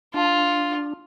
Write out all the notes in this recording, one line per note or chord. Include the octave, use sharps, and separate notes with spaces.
D4 F4